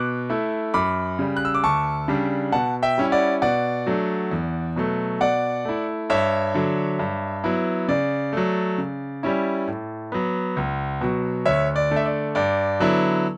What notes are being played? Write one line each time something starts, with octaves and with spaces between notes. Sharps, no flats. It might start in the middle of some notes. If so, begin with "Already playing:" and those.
Already playing: B2 D6 F#6
A3 E4
F#2 B5 D6
C#3 G3
F#6
E6
D6
D2 A5 C#6
C#3 G3 D4
B2 F#5 A5
E5 G5
G3 C#4 E4
D5 F#5
B2 D5 F#5
F#3 A3 D4
E2
B2 F#3 A3
B2 D5 F#5
A3 E4
G2 C#5 E5
D3 F#3
G2
F#3 B3 E4
C#3 D5
F#3 A3
C#3
G3 C#4 E4
A2
F#3 B3
C#2
B2 F#3
D2 C#5 E5
D5
D3 A3
E5
D5
G2 D5
D3 F#3 B3 E4